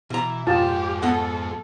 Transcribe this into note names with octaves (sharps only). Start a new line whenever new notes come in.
B2 E3 A#5
F2 G#2 F4 G4 A5
B3 A4 D#5 F#5